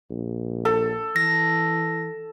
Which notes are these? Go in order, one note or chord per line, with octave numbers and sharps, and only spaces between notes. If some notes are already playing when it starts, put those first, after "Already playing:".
A#1
A4
E3 A#6